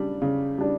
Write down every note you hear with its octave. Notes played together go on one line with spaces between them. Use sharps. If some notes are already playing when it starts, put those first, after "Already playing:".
Already playing: C#3 G3 D4
C#3
G3 D4